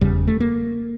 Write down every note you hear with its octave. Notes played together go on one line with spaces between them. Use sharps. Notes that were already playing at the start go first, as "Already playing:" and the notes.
F1 E2 C#3 G3
A3
A#3